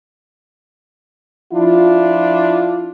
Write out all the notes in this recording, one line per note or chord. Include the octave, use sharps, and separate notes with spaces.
F3 D4 E4 F4